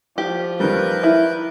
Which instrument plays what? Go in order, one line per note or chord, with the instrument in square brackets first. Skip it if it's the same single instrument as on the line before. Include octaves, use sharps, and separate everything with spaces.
[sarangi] F3 [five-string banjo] G4
[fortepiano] D#3 G3 [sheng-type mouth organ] A#4 B4 G6
[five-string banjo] E4